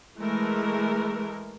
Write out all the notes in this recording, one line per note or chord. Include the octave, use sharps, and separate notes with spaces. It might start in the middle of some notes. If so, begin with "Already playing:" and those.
E3 G#3 A3 A#4